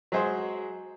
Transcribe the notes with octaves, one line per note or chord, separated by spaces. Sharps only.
F#3 G#3 G#4 C5